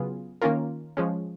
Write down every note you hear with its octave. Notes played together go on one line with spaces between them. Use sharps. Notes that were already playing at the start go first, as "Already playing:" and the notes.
Already playing: C#3 F#3 B3 F4 G#4
D#3 A#3 C#4 F4 A#4
F3 G#3 C#4